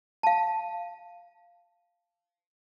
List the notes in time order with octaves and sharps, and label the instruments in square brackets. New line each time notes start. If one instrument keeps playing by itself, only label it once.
[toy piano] F5 A5